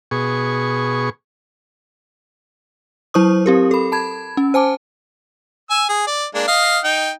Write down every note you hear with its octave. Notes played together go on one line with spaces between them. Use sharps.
B2 G#4 C#6
F#3 E4 C5 C#6 D#6
C4 G4 A#4
A4 B5
A5 B5 G#6
C#4
C5 G#5 A5 D6
G#5 E6
G#4
D5
G#3 A#3 D4
D#5 F5
D#4 G5